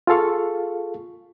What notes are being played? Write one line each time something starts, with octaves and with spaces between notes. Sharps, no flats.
F4 G#4 A4 F5 C#6